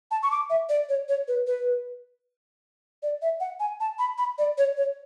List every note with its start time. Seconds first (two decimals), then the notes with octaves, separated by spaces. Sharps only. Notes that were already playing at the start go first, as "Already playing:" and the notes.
0.11 A5
0.23 C#6
0.31 D6
0.50 E5
0.69 D5
0.89 C#5
1.09 C#5
1.28 B4
1.47 B4
3.03 D5
3.22 E5
3.40 F#5
3.60 G#5
3.80 A5
3.99 B5
4.18 B5
4.38 D5
4.58 C#5
4.77 C#5